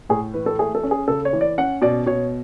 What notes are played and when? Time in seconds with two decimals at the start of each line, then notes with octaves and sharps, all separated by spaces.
0.09 A2 G#4
0.34 E3 B4
0.46 A4
0.59 A3 G#4
0.75 A4
0.83 C#4
0.91 G#4
1.08 C#3 A4
1.25 C#5
1.33 E3
1.41 D5
1.58 C#4 F#5
1.82 B2 D5
2.06 B2 C#5